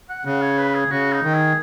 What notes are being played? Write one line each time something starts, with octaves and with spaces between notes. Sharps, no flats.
F#5
C#3 F#5
C#5
B4
G#4
C#3 F#4
D#4
D#3
G#4